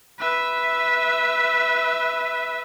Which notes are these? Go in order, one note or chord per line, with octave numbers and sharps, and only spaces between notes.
B4 E5